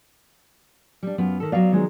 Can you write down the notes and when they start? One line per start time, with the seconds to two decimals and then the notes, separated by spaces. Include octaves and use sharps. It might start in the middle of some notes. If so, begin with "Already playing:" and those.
1.03 G3 D4
1.18 F#2 B3 F4
1.40 D#3 A4
1.52 F#3 B3 D5 F5
1.72 D#3 F3 G#3